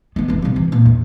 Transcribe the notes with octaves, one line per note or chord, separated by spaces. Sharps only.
D#3 B3
F1 E3
C3 G3
E3
A#2
E2